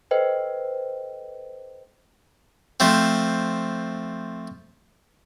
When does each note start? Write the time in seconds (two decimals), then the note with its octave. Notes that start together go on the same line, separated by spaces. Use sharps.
0.11 A4 B4 C5 D#5 G5
2.80 F3 A3 C4